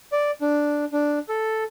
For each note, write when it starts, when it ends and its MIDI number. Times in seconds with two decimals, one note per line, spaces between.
0.12 0.31 74
0.41 0.85 62
0.93 1.19 62
1.29 1.64 69